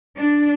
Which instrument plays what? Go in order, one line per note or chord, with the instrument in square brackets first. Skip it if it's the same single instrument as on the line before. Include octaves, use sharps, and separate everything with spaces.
[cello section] D4